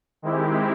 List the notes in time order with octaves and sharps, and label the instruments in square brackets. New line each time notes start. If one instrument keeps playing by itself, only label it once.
[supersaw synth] D#3 G#3 C4 E4 G4